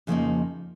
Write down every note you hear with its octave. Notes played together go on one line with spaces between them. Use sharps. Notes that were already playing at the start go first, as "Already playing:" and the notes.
F2 C#3 F3 A#3 D#4